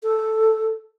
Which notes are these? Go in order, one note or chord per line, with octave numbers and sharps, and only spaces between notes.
A4